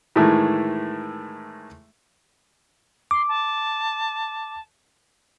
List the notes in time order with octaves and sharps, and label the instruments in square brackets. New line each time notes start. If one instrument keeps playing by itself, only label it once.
[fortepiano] A2 D#3 E3 G#3 A3
[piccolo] C6 [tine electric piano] D6
[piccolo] A5